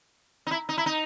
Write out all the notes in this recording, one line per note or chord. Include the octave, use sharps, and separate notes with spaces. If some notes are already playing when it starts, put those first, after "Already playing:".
D#4
E4
D#4
E4
D#4